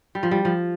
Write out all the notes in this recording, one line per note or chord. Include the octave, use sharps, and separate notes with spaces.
G3
F3
G3
F3